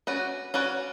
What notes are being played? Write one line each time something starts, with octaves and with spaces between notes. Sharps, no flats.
C#4 F#4 B4 D5
C#4 F#4 B4 D5